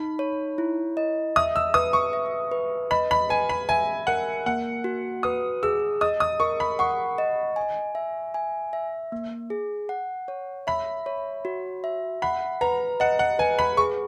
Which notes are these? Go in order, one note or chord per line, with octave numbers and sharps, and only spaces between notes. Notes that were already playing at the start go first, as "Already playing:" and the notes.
Already playing: D#4 B5
C#5
E4
D#5
E5 D#6
E6
B4 D#6
C#6
E5
B4
D#5 B5
B5
B4 G#5
B5
E5 G#5
A#4 F#5
A#3 F#5
F#4
B4 D#6
G#4 E6
D#5 D#6
D#6
A#4 C#6
B5
F#5 C#6
D#5
G#5
E5
G#5
E5
A#3
G#4
F#5
C#5
E5 B5
C#5
F#4
E5
F#5 B5
B4 A#5
D#5 F#5
F#5
B4 G#5
B5
G#4 C#6